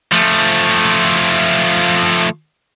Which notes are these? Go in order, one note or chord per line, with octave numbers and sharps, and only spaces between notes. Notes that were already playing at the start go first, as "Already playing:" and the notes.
F3 A3